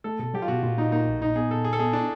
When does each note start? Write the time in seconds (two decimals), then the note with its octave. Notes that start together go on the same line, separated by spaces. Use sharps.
0.04 A3 A4
0.19 B2 A4
0.34 F#3 G4
0.42 F4
0.48 B2 F#4
0.63 A#2 F4
0.78 A#2 D#4
0.92 A#3 D#4
1.07 A#1
1.21 A#2 D#4
1.35 B3 G#4
1.50 A#2 A4
1.64 A#2 G#4
1.73 A4
1.79 B3 G#4
1.93 D4 E4